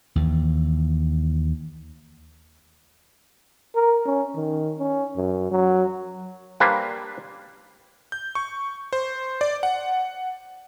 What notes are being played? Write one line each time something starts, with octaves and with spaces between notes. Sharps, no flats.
D#2 E3
A#4
C#4
D#3
C#4
F#2
F#3
G3 A#3 D4 B4 C5
G6
C#6
C5
D5
F#5